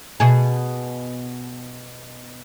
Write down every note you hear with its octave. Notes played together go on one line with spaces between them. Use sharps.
B2 G#4